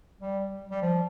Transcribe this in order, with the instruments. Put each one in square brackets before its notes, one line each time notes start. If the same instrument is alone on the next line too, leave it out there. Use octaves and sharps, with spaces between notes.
[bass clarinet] G3
G3
F3